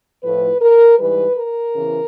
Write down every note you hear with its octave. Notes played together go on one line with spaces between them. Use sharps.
A2 F3 B4
A#4
G#2 E3 G3 B4
A#4
E2 C#3 E3